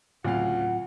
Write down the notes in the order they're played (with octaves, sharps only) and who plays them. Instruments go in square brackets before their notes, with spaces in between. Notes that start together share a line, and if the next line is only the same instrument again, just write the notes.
[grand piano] D2 C#3 F5 [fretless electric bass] A2 F#3 C4 [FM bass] F4 [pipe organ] F#5